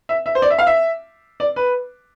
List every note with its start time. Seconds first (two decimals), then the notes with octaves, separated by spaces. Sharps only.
0.09 E5
0.26 E5
0.35 C5
0.42 D5
0.50 E5
0.59 F5
0.67 E5
1.40 D5
1.56 B4